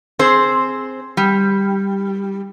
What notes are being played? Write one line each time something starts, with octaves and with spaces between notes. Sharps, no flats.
C4 G#4 C5
G3